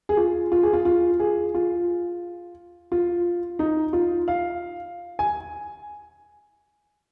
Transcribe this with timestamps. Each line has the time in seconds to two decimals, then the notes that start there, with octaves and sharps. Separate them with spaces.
0.09 G#4
0.17 F4
0.52 F4
0.63 G#4
0.73 F4
0.85 F4
1.20 G#4
1.54 F4
2.92 F4
3.59 D#4
3.93 F4
4.28 F5
5.19 G#5